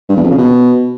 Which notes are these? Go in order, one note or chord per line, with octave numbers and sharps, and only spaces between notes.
G2
E2
F2
C#3
B2